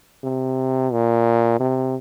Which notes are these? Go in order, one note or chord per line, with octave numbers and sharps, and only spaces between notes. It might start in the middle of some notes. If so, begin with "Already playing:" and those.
C3
A#2
C3